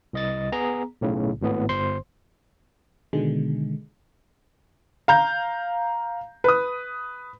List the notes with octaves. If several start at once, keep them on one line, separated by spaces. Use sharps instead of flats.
C2 D#5 A6
B3 G#4 A#5
B1 A2 C#3
G#1 A2 B3
G1 C5 C6
B2 D3 D#3 G#3
F5 A#5 G6
B4 D#6